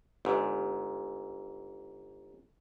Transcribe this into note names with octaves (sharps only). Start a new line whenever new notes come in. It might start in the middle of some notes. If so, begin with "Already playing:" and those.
G1 G#2